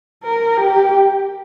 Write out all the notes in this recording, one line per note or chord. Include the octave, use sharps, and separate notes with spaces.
A#4
G4